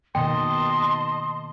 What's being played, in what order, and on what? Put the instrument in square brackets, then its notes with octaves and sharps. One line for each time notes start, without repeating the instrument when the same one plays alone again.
[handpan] B2 D#3 A#3 [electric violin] D#5 A5 [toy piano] G5 [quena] C6